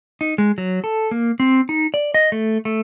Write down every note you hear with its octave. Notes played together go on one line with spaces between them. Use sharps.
D#4
G#3
F#3
A4
A#3
C4
D#4
D5
D#5
A3
A3